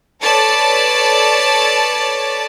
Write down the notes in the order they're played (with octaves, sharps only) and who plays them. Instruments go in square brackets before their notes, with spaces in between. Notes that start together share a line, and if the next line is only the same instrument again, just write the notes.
[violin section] A4 B4 C#5 D5 A5